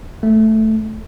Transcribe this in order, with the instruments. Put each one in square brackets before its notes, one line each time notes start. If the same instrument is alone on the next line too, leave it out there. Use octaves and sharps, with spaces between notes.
[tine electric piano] A3